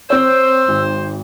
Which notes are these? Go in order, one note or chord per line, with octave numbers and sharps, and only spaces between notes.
C4 C5 C#5 E6
G#1